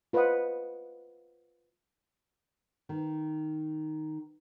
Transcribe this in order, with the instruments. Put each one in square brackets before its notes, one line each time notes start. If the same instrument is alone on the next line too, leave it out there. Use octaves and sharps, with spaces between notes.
[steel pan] F4 B4 C5 D#5 F#5 D#6
[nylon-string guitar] D#3